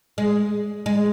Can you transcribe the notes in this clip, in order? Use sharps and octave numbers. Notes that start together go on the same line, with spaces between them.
G#3
G#3